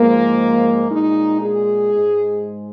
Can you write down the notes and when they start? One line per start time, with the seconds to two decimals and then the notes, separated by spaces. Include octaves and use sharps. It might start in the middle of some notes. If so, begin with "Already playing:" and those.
Already playing: G#2 F3 G#3 A#3
0.89 A#2 G#3 D#4
1.41 G#4
1.93 G#2 G#3